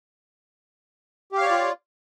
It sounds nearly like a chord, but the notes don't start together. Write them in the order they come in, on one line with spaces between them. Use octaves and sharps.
G4 F5 C#5 D5 F4